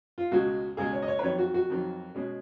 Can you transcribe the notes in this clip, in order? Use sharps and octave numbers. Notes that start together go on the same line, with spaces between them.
F4
C#2 B2 G#3 F#4
C#2 B2 G#3 G#4
C#5
D#5
C#5
B4
F2 D#3 F#3 C#5
F#4
F#4
F2 D#3 F#3
B2 G#3 C#4